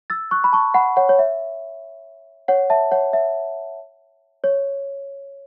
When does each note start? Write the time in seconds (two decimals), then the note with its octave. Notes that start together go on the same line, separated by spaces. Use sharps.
0.10 E6 A6
0.31 C#6 F#6
0.44 B5
0.53 A5 C#6
0.74 F#5 B5
0.97 C#5 F#5
1.09 C#5
1.19 E5
2.48 C#5 F#5
2.70 E5 A5
2.92 C#5 F#5
3.13 E5
4.44 C#5